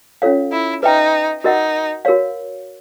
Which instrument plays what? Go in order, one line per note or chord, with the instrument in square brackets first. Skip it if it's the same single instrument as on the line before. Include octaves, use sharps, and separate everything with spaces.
[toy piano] C#4 F4 A4 C#5 F5
[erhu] E4
[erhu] D#4 [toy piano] B4 E5 G5 A#5
[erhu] D#4 [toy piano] F#4 A#4 D#5 F#5
[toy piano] F#4 A#4 C#5 F5